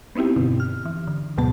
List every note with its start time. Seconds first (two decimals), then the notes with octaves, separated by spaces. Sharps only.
0.15 B3 C4 D#4 E4 G4
0.36 G2 B2 D3
0.60 F6
0.85 E3
1.07 D3
1.38 D2 G#2 B2 F#3 B3 A5